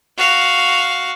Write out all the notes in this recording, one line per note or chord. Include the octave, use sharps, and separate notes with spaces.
F#4 F5